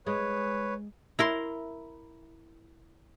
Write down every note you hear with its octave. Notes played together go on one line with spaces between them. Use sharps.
G#3 B4 C#5
E4 A#4 C6